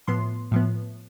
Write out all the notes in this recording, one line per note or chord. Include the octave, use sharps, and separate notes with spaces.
A2 F3 B3 C6
A2 F3 B3